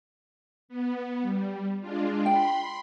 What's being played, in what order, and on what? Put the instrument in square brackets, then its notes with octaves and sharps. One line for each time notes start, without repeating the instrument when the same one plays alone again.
[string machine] B3
G3
G#3 D4 F4
[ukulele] G5 [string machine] B5 C6